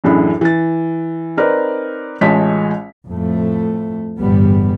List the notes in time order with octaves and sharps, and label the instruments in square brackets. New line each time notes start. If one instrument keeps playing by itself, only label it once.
[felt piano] A1 F#2 A2 D4 G#4 B5
E3 A6
C4 D#4 A#4 B4 D5
A1 G#3 F4 C#5 A5 B6
[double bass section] F2 A2 A3
G1 E2 A2 G3 B3